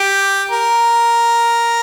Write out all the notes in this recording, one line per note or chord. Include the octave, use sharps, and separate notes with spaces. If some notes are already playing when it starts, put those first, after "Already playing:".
Already playing: G4
A#4